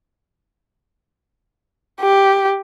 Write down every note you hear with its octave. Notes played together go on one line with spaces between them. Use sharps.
G4